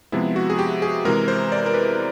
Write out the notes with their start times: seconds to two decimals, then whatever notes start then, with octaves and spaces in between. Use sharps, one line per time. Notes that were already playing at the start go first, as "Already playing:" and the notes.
0.12 C3 F3 G#3 B3 E4
0.36 F#4
0.50 G#4
0.59 G4
0.82 G#4
1.05 C3 E3 G#3 A#4
1.28 C5
1.52 D5
1.66 A#4
1.74 B4